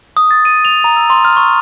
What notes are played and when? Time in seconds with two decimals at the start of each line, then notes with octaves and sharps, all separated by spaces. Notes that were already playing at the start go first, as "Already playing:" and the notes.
0.17 D#6
0.31 A6
0.45 D#7
0.65 F7
0.84 A#5
0.96 E6
1.10 C6
1.25 F6
1.37 C#6